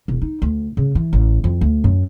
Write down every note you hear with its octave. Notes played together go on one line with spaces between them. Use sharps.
E1
D#4
D2
C#3
E3
A1
F2
D2
F#2